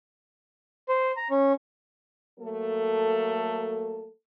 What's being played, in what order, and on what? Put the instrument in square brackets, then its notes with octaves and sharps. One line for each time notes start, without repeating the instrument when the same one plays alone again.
[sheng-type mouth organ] C5
A#5
C#4
[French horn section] F#3 A3 A#3 A4